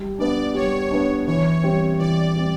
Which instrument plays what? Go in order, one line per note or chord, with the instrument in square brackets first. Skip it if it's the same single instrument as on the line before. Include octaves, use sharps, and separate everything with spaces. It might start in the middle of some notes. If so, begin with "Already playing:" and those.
Already playing: [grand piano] G3
[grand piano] B3 D4 [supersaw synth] D5
[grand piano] G3 [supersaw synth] C#5
[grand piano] B3 D4
[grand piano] E3 [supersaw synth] C#5
[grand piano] G3 C4
[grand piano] E3 [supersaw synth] D5
[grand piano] G3 C4